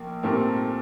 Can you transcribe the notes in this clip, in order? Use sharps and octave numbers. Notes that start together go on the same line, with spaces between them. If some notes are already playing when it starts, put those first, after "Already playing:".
Already playing: A#1 A#3
A#2 A3 C4 G4 A#4